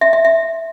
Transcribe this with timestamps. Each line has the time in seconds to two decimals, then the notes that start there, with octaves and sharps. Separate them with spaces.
0.01 E5
0.13 E5
0.25 E5